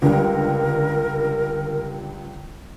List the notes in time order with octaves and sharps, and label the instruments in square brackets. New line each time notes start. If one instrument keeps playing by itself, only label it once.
[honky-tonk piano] C#2 D3 G3 [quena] A#4